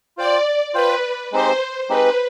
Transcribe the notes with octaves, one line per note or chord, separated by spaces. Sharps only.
F4 C5 D5 G5
F4 B4 C5 G5
G#3 C4 D#4 G4 C5
G#3 C4 D#4 G4 B4